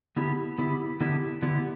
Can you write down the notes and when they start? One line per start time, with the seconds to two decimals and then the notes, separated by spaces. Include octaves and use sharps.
0.16 D3 B3 E4 G4
0.58 D3 B3 E4 G4
1.01 D3 B3 E4 G4
1.42 D3 B3 E4 G4